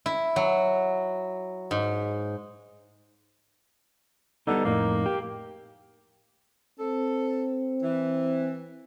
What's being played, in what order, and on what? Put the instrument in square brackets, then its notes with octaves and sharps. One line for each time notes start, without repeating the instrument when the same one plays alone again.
[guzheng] E4
F#3
G#2
[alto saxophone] D3 [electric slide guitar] G3 B3 D#4
[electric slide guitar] F2 A2 D#4 [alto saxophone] A#3
[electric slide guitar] G4
[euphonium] C4 [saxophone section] A4
[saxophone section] E3